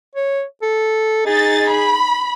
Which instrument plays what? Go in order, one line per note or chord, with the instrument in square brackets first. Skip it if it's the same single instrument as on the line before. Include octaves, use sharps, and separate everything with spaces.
[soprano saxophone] C#5
A4
[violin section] D#4 A6 [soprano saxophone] G#4
[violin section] B5